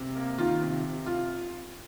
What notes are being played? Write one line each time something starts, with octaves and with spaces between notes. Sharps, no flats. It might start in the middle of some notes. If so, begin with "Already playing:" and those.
Already playing: C3
A#3
D#3 F4
C3
C3
F4